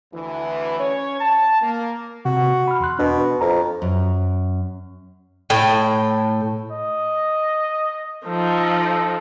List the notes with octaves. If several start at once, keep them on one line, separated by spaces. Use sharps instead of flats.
D2 E3
C#4 C#5
A5
A#3
C3 F#4
B5 F6
E2 C6 F#6
B2 D4 B4
F2 A#5
F#2
A2 G5
D#5
F3 D#4 A4